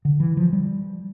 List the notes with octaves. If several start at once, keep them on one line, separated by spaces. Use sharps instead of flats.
D3
E3
F3
G3